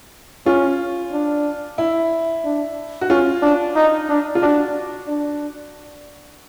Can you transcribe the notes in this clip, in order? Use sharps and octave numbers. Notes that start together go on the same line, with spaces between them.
C#4 F4
D4
E4
D4
F#4
C#4 F4
D4
D#4
D4
F4
D4 F#4
D4